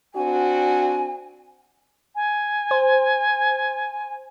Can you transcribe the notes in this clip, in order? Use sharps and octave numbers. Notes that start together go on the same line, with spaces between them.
C4 D4 F#4 G#5
G#5
C5